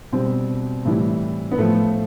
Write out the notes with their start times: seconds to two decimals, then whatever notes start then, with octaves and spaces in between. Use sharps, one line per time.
0.12 B2 G3 C4
0.85 A2 E3 G3
1.52 B3
1.58 A2 F3 A3